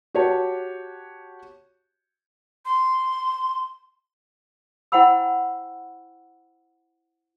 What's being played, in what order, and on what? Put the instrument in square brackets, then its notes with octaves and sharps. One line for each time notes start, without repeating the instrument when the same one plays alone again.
[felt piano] F#4 G4 C#5 A5
[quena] C6
[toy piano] E4 C5 F#5 G5 B5 E6